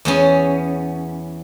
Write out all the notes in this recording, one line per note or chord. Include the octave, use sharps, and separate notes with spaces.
E2 B3 C#4